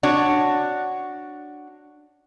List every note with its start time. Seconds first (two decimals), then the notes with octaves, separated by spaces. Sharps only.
0.03 D4 F#4 C#5